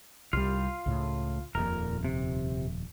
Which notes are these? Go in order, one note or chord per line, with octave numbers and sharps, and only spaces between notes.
C2 G3 F4 F5
C#2 A2
D#1 F2 A#2 A#4
C3